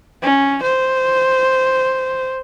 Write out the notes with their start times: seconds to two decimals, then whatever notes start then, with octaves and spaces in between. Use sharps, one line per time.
0.22 C#4
0.63 C5